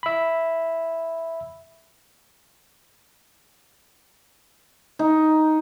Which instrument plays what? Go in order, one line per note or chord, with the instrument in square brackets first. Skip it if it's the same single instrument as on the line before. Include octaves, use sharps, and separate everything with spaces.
[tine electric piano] E5 B5
[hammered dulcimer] D#4